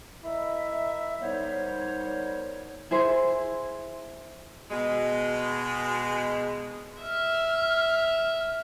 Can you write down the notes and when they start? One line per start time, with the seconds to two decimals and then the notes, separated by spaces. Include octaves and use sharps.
0.24 E4 A#4 D#5 E5
1.22 G3 B3 D#4 A#4 C5 C#5
2.91 E4 G#4 C5
4.70 B2 G#3
7.02 E5 F6